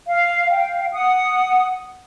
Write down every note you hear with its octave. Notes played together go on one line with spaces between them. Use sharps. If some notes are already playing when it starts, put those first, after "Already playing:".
F5
F5 G5
F#5 D#6